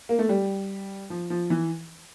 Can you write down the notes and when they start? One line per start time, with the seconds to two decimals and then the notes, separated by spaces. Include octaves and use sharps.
0.09 A#3
0.19 A3
0.29 G3
1.10 F3
1.30 F3
1.50 E3